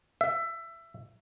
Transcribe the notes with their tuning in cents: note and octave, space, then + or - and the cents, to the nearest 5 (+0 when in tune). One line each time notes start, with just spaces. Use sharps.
E5 +20